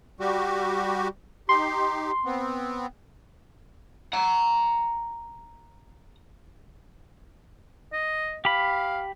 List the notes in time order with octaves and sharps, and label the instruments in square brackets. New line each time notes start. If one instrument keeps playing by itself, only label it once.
[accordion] G3 F#4 G4
[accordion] D#4 G4 [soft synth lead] C6
[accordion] B3 C4
[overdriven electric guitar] F#5 A#5
[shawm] D#5
[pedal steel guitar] G4 B5 [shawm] F5